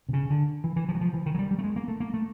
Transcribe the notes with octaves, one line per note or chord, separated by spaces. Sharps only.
C3
C#3
D3
E3
E3
F3
F#3
F3
E3
D#3
F#3
G3
G3
A3
G#3
A#3
A3
A#3
A3